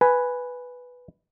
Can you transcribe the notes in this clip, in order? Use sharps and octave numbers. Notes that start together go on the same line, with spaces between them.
B4 G#5